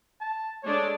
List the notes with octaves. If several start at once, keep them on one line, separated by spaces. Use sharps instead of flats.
A5
G#3 A3 D4 C#5